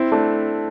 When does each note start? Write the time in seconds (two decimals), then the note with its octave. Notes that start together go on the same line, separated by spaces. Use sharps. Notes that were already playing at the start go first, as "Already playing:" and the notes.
Already playing: C4 E4
0.12 A3 D4